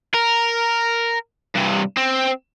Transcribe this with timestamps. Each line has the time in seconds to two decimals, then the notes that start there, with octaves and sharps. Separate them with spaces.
0.14 A#4
1.56 G2 C3
1.97 C4